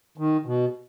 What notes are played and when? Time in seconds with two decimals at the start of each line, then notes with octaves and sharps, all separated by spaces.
0.18 D#3
0.46 B2